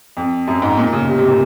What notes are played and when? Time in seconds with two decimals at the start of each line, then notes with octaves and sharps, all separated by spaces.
0.17 F2
0.48 F#2
0.62 G#2
0.77 A#2
0.93 C#3
1.07 C3
1.18 C3
1.29 A#2